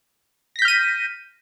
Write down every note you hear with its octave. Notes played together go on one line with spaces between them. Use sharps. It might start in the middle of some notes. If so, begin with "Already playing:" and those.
F6 G6 A#6 B6 D#7